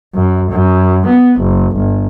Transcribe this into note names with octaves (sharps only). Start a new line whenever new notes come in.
F#2
F#2
B3
F#1
G1